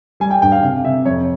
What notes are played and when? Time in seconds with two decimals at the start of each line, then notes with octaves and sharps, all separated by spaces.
0.20 G3 G#5
0.31 G5
0.42 G2 G5
0.52 F5
0.63 C3 F5
0.84 C3 E5
1.05 F2 C#5